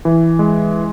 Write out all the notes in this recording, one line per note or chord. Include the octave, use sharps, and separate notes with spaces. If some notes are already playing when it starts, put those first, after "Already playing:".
E3
G#3